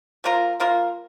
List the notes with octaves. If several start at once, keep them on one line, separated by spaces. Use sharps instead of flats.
F3 A#3 F4 A#4
F3 A#3 F4 A#4